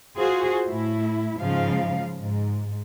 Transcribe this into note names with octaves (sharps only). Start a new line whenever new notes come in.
F4 F#4 G#4 C5
A2 E4
G#2 C#3 F3 F5
G#2